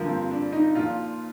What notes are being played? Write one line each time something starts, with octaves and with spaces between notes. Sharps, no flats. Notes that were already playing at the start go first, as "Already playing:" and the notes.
Already playing: G2 D3 F3 A#3
C4
D4
D#4
A#2 F3 F4